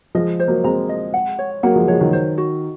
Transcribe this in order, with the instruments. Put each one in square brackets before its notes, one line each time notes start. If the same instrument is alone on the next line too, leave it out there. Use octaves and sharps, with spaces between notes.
[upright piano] F3 G#3 [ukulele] D#5
[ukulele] C5
[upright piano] F#3 A#3
[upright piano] G#3 C4 [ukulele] A#5
[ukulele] D#5
F#5
C#5
[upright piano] F#3 A#3 [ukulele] F#5
[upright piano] F3 G#3
[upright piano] F3 G#3 [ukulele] C#5
[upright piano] D#3 F#3
[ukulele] C5
F#4